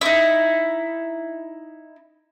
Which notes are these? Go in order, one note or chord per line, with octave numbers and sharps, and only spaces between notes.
D#4 E4